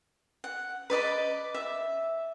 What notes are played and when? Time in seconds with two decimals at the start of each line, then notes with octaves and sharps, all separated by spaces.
0.44 F#5
0.90 B4 D5 D#5 B5
1.55 E5